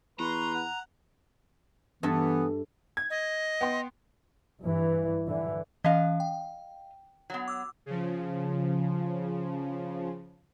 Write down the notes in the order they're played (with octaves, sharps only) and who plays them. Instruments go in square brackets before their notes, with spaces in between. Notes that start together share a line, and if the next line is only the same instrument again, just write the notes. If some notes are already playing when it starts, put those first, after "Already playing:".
[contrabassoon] E2 [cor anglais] B4 [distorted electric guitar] A#5 [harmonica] C6 C#6
[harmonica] F#5
[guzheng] G2 A4 E5 [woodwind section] E3 B3
[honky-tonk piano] G#6
[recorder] D#5
[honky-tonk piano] B3 G5 C6
[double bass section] G2 E3
D3 E3
[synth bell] E3 C#4 [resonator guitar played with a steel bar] D#5 F5
[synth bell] G5
[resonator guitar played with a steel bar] F#3 B3
[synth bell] D6 E6
[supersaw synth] C#3 F3